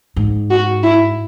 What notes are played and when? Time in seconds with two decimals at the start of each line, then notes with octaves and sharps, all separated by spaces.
0.16 G#2
0.51 F#4
0.84 E4